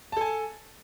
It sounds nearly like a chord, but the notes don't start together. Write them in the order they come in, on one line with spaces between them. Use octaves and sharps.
A5 A4 G#5